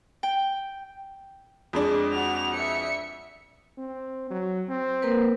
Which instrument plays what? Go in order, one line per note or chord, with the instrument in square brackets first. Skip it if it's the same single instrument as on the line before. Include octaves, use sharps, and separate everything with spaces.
[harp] G5
[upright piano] F2 G#3 D4
[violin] F#4 F7
E5 C#7
[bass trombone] C4
F#3
C4
[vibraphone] A#3 A#4 B4